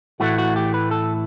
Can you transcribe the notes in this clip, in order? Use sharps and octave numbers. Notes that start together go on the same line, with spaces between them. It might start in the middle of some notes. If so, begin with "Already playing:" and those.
A2 E3 A3 F#4
F#4
G4
B4
A4